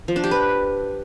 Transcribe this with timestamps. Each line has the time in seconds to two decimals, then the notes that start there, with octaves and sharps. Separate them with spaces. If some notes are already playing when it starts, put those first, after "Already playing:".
0.08 F3
0.16 D4
0.24 G4
0.31 B4